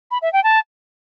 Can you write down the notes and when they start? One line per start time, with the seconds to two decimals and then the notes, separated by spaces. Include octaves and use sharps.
0.11 B5
0.22 E5
0.33 G5
0.44 A5